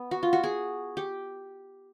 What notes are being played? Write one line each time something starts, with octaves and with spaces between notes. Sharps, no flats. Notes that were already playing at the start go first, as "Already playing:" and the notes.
Already playing: B3
F#4
F4
F#4
G#4
G4